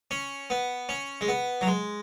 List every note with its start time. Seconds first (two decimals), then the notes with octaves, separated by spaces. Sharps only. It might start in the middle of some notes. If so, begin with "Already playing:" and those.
0.11 C#4
0.50 B3
0.89 C#4
1.21 G#3
1.28 B3
1.61 F#3
1.67 G#3